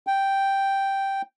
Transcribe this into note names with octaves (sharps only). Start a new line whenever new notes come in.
G5